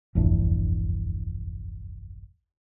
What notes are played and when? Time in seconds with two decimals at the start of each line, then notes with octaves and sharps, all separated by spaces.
0.15 F1 A#1 E2 G2